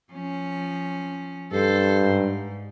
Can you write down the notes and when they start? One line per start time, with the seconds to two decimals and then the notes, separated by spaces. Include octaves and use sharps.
0.12 F3 C#4
1.52 G2 A4 C5
2.04 G#2